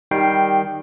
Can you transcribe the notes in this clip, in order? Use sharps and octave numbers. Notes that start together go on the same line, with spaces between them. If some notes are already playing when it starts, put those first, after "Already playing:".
D#3 G3 G5 C7